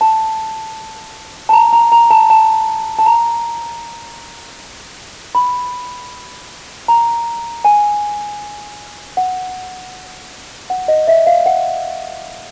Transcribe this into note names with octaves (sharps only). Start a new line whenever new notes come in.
A5
A5
A#5
A#5
A#5
A5
A5
A5
A#5
B5
A#5
G#5
F#5
F#5
D#5
E5
F5
F#5